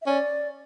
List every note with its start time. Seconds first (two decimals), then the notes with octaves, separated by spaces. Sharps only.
0.02 E5
0.06 C#4 D5